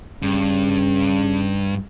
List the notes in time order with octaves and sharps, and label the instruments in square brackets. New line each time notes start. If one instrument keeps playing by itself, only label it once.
[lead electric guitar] G2 [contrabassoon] C#3